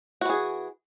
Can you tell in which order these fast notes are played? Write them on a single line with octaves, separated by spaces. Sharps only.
F#4 E3 G#4